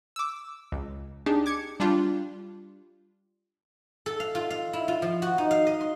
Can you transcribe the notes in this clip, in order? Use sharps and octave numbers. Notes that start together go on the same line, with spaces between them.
D6 E6
C#2
D4 D#4 G4 G#4
D6 G#6 C#7
G3 D4 F4 G4
A4
F5
F4
F5
E4
F4
F3
F#4
D#4
F5
D#5
C6